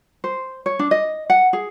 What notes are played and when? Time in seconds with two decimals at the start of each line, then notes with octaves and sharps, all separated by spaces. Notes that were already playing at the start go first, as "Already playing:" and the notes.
0.24 C5
0.66 C#5
0.79 D4
0.91 D#5
1.30 F#5
1.53 G#4